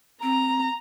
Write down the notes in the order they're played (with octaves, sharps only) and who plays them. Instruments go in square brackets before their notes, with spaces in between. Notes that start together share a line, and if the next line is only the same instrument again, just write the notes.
[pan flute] C4 [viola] A#5